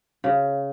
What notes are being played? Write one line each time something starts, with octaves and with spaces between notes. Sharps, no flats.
C#3